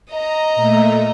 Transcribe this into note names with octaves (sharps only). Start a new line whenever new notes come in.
D#5 A#5
A#2 A3 E5